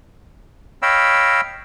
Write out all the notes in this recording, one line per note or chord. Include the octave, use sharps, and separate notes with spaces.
C#5 D#5 F5 G5 B5 E6